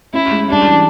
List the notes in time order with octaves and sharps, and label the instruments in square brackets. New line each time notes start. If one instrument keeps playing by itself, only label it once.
[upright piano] C#4 [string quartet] E4
[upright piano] G#3
[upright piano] G3 [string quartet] D4
[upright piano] E3